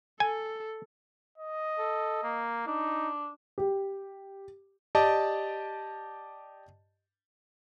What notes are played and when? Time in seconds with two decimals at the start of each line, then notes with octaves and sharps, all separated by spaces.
0.20 A4 G#5
1.38 D#5
1.78 A4
2.23 A#3
2.67 D4 D#4
3.58 G4
4.95 G4 D5 D#5 A5